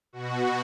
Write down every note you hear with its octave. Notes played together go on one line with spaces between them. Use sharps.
B2 F#4